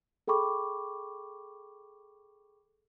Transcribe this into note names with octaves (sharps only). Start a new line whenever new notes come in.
G#4 A4 G5 B5 C#6 D6